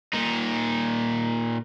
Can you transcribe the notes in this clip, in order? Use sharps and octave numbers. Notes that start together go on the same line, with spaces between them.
A#2 D#4